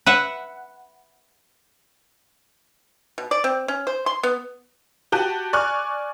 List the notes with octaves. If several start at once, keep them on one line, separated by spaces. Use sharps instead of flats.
B4 E5 F#5
B2
D5
C4
C#4
C5
C6
B3
F#4 G4 A5 F#6 D#7
D5 G#5 C#6 F6 F#6